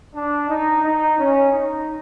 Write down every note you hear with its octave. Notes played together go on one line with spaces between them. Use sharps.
D4
D#4
D#4
C#4
D#4